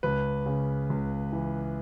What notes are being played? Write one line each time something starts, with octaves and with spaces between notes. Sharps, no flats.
C#2 B4
C#3
C#2
E3